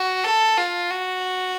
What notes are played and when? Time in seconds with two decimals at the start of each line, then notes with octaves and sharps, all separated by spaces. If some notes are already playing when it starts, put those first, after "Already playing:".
Already playing: F#4
0.24 A4
0.57 F4
0.91 F#4